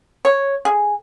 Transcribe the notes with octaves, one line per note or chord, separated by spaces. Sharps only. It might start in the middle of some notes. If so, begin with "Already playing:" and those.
C#5
G#4